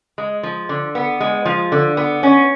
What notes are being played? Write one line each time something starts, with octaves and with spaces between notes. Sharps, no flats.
G#3
F3
D3
B3
G#3
F3
D3
B3
C#4